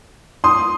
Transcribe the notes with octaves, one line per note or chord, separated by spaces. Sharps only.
C6 D#6